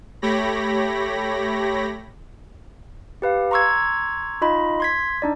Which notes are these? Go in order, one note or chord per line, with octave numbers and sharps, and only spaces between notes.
A3 G4 C#5 B5 A#6
G4 B4 F5
A#5 C6 C#6 E6 G#6
D#4 F4 D#5 B5
C6 G#6 B6
D4 D#4 D5